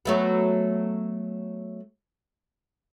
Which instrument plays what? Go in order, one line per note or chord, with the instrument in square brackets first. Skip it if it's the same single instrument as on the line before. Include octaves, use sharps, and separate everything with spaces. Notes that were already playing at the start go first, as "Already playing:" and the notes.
[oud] F#3 A3 B3